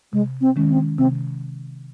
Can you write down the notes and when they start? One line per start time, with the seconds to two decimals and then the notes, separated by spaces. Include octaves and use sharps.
0.13 C3 G#3
0.41 C4
0.56 D#3 G#3 C#4
0.70 C4
0.98 C3 C4